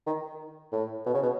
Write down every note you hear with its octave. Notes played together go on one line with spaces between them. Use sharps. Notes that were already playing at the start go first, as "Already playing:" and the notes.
D#3
A2
B2
C#3
B2